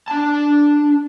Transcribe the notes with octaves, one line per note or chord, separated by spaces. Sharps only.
D4 A5